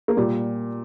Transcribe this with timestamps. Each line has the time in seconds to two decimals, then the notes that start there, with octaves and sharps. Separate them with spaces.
0.08 A#3
0.17 A#2 G3